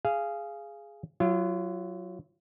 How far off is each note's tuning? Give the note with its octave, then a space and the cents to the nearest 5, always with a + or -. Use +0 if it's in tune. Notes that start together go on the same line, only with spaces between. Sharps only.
G#4 +0 F5 -15
F#3 +0 F4 -35